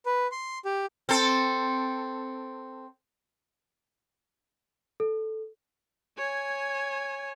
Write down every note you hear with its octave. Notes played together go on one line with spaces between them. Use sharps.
B4
C6
G4
C4 A4
A4
C#5 G#5